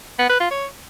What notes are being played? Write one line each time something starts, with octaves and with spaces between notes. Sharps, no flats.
B3
B4
F4
C#5